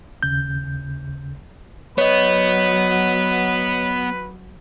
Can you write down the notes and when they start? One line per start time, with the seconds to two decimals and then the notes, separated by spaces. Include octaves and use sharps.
0.23 D#2 C#3 G6
1.98 F#3 B3 B4 C#5 D#5